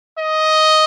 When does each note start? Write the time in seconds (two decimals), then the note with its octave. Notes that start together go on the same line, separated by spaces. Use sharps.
0.18 D#5